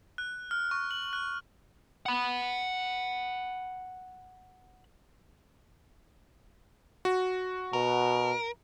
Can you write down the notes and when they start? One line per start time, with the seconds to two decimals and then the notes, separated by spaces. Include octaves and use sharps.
0.18 F#6
0.51 F6
0.71 C#6
0.91 F#7
1.13 F#6
2.06 F#5 B5
7.05 F#4
7.73 B2 A#4